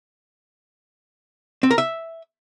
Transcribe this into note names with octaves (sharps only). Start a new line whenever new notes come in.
C4
A#4
E5